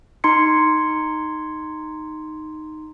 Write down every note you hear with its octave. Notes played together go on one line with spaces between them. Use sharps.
D#4 A#5 C6 G#6 C#7